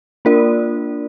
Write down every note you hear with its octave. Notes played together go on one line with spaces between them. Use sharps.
A#3 D4 F4 A#4 D5